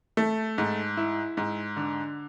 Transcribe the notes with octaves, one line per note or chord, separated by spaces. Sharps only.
A3
G#2
E4
G#2
D3